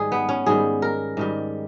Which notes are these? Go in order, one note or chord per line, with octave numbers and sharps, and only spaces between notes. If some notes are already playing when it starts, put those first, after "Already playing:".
Already playing: G#2 D#3 G3 G#4
B3
C#4
G#2 D#3 G3 G#4
A#4
G#2 D#3 G3